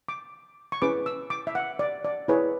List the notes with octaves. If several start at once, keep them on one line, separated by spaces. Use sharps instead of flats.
D6
C#6
C#4 E4 G#4 B4 D6
E6
D6
E5
F#5
D5
D5
E4 G#4 B4 C#5